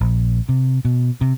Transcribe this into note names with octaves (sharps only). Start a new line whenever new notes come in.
A#1
C3
B2
C3